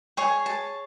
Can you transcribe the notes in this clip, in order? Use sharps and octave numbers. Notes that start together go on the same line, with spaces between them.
G#4 C#5 G#5
A5